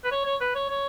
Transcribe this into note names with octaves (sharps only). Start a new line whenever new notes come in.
B4
C#5
C#5
B4
C#5
C#5